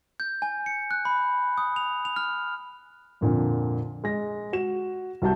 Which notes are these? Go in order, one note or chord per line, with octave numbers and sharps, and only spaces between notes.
G6
G#5
C#7
F#6
B5
D#6
F7
F7
F6
F2 A#2 D3
G#3 A#6
F#4 E7
C2 F#4 A5 G6